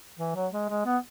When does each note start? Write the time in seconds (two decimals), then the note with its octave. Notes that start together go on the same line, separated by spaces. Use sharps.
0.19 E3
0.35 F#3
0.53 G#3
0.69 G#3
0.86 B3